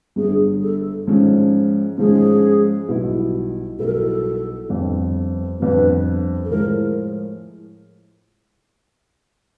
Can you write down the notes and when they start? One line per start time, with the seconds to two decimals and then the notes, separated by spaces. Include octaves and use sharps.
0.16 G1 G2 D3 G#4
0.62 A4
1.07 G#2 F3 G#3 C#4
1.98 G#2 F3 G#3 C#4 G#4
2.88 B1 B2 G3 B3 E4
3.78 B1 B2 G3 B3 E4 A4
3.86 A#4
3.93 A4
4.69 G1 F2 D3
5.60 G1 F2 D3 B4
6.45 A4
6.50 A2 F3 G#3 A#4